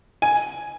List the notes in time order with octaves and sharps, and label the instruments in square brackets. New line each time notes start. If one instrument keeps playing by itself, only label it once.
[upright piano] G#5